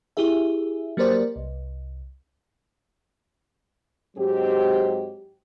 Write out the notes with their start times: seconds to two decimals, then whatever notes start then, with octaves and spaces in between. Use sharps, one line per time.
0.17 E4 G4 G#4 E5
0.97 F#3 A#3 G4 A#4 C5 D5
1.36 C2
4.17 G#2 F#3 G#3 C4 G4